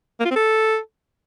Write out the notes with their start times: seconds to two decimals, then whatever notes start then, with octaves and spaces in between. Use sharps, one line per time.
0.20 A#3
0.25 F4
0.30 C4
0.36 A4